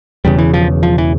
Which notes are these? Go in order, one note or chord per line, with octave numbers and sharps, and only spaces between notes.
E1 E2 C#3 G3
E3
F3
F3
E3